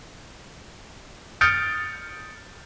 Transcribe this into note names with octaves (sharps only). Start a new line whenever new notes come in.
D#6 F6 G6 A6 C#7 D7